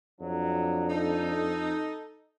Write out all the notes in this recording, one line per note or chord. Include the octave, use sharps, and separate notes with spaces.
F2 F#3 D4
D#4 A4